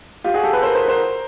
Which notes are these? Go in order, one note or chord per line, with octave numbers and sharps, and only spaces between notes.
F4 G4
F#4 G#4
G4 A4
A4 B4
A#4 C5
A#4 C5
A#4 C5